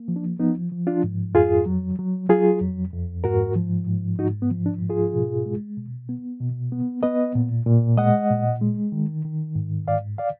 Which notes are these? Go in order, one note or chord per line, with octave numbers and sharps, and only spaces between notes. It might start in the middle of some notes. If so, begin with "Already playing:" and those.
Already playing: A#3
F3
D4
F3 B3 D#4
F3
D4 F4
G#2
F2 F4 G#4
F#3
F#3
F#3 F4 G#4
F2
F2
G#2 F#4 A#4
F3
G#2
G#2 D#4 F#4
B3
F3
D4
G#2
F4 G#4
B2
G#3
B2
B3
B2
B3
B3 B4 D#5
A#2
A#2
G#3 D#5 F#5
A#2
G#3
D#3
D#3
G#2
G#2 D5 F5
D5 F5